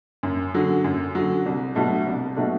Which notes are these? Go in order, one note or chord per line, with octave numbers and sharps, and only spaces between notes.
F#2
D3 F#3
F#2
D3 F#3
C2
B2 F#3 A3 D4
C2
B2 F#3 A3 D4